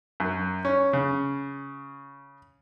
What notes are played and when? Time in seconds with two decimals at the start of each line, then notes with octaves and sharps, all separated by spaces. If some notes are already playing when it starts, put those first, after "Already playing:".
0.20 F#2
0.65 C#4
0.93 C#3